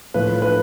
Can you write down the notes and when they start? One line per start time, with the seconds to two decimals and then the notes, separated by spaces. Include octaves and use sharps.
0.14 A2 F3 B4
0.42 B4